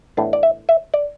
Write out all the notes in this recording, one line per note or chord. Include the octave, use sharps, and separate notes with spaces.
A2 E3 B3 D4
D5
E5
E5
D5